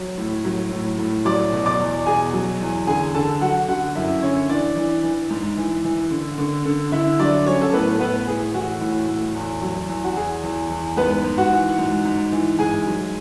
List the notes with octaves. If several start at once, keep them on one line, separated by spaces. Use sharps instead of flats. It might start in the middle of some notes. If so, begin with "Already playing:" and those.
Already playing: F#3 C#5
A2
F#3
A2
A2
F#3 D5 D6
B2
D5 D6
E2
B2 G#4 G#5
F#3
E2
D3 G#4 G#5
D3 A4 A5
F#3 F#4 F#5
D3 F#4 F#5
F#2 E4 E5
D3 C#4 C#5
E3 D4 D5
E3
E3
G#2
E3
E3
D3
D3
D3
D3 E4 E5
F#3 D4 D5
F#3 C#4 C#5
A4
A2 B3 B4
A2 B3 B4
A2 G#4
E3 F#4
A2
A2
E2
F#3
E2
F#4
E2 G#4
E2
E2
G#2 B3 B4
G#2
F#4 F#5
E3
G#2
G#2
E3
G#2 G#4 G#5
F#3